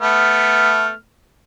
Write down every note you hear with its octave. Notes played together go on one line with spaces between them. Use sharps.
A3 B3 F6